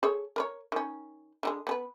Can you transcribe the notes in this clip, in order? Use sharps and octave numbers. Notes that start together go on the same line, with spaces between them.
G#4 A4 C#5
A#4 B4 C#5
D#3 C#4
D3 F#3 G#3
B3 G#4 B4